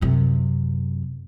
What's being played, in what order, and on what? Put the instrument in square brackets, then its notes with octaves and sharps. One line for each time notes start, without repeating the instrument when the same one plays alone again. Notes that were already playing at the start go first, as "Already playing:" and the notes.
[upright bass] F#2 C3